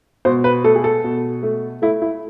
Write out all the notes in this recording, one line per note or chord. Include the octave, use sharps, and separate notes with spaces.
B2 C5
B4
A3 A4
G#4
A4
B2
A3
A3 E4
E4